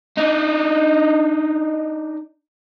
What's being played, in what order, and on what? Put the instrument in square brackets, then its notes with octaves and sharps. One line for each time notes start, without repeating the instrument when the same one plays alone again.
[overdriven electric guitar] D4 D#4